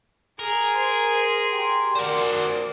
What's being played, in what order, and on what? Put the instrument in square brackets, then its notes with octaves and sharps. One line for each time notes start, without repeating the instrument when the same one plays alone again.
[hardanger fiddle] G#4 [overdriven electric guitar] A#4
[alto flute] C5 [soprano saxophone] C6
[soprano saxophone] G4 [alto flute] C6
[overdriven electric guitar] F#4 C5 [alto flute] A#4 [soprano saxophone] D5